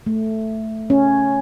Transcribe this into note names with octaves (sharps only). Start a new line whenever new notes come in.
A3
C#4